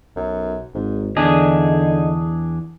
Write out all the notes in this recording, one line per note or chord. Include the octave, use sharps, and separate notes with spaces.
B1 F#2
G#1 G#2
E2 D3 D4 D#4 G#4